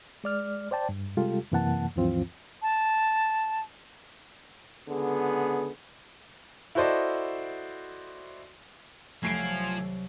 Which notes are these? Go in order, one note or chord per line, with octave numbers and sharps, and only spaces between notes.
G#3 D5 F6
C5 D5 G5 A5
G2
C3 G3 G#3 F4 G4 A4
F#2 C3 E3 A#3 F#5 A5
D2 G2 E3 F3 C4 F4
A5
C#2 D3 B3 G#4
E4 F#4 A4 C5 D5 D#5
C2 F3 F#3 A3 G#5 C7 D7